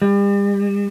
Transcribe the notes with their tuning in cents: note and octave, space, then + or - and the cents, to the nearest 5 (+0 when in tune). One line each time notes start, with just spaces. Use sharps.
G3 +40